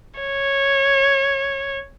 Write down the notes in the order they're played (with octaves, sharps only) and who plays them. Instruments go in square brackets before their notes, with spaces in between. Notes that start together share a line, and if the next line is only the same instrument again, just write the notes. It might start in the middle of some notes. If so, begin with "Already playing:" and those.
[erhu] C#5